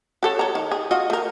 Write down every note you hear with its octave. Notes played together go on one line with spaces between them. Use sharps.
F#4 A4 C#5
C#5 A#5
D#3
G#4
F4 F#4 D#5
A3 A#4